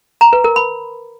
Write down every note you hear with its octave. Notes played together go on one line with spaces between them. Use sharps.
A#5
B4
A#4
B5